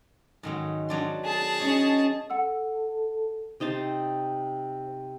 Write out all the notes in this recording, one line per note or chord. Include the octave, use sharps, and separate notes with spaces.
G#2 D#3 F#3
F#3 D4 C6
G#4 A5
C#4 D#4 C#5
A4 F#5 E6
C3 D#4 C5 A5